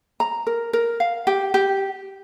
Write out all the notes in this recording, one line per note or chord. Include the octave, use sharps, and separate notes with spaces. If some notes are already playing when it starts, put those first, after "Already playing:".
A#5
A#4
A#4
F5
G4
G4